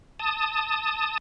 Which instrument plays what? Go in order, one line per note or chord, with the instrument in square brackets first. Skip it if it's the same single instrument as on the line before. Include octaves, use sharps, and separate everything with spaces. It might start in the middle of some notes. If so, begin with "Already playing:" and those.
[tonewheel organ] A5 D#6